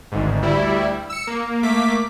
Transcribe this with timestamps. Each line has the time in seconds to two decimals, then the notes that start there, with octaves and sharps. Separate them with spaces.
0.12 G#1 D2 G#2
0.42 D2 G3 E4
1.10 E6 C#7
1.27 A#3
1.63 A3 A#3 D6 B6